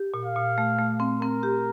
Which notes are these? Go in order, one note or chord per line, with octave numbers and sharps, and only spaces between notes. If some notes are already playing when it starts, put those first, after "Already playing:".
Already playing: G4
A#2
F5
A#2
A3
A3
C4
C4 A#4
G4